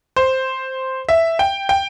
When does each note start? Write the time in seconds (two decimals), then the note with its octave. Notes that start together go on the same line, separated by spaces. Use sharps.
0.16 C5
1.09 E5
1.39 G5
1.69 G5